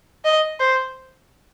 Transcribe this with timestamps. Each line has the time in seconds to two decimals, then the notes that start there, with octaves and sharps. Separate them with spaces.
0.25 D#5
0.60 C5